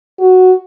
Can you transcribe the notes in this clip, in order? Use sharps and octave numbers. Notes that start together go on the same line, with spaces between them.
F#4